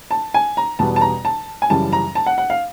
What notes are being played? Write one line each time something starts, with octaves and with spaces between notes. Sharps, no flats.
A5
G#5
A#5
E2 B2 G3 B3 A5
A5
A#5
A5
G#5
F#2 C#3 E3 G3 A5
A#5
A5
F#5
F#5
F5